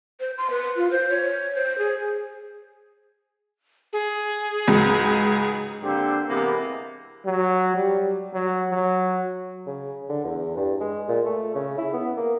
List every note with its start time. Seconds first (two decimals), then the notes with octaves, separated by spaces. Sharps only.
0.20 C5
0.38 C6
0.50 B4
0.77 F4
0.91 C5
1.10 C#5
1.55 C5
1.78 G#4
3.93 G#4
4.68 C#2 G#2 F#3
5.83 D3 A#3 C4 G4 C5
6.28 C3 E3 G#3 A#3 B3
7.26 F#3
7.76 G3
8.34 F#3
8.70 F#3
9.67 C#3
10.09 D3
10.25 E2
10.57 G2
10.81 G#3
11.08 A#2
11.25 A3
11.55 C#3
11.78 E4
11.94 B3
12.17 A#3